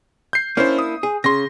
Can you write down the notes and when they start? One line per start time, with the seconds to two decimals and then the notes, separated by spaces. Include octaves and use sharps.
0.33 G6 C7
0.57 A#3 C#4 D4 E4 C5
0.79 D#6
1.03 G#4
1.24 C#3 C6 A#6